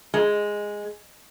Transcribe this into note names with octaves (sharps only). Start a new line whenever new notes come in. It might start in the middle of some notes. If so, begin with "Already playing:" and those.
G#3